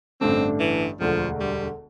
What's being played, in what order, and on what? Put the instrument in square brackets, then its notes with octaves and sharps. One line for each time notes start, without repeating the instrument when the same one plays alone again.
[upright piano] A1 G2 D3 A3 D4 [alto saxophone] C4
[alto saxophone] E3
[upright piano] E1 D2 D3 [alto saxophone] F3
[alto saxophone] G3